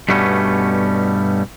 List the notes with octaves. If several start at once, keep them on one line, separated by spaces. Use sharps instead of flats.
G2 B2 G3 A3 B3 C#4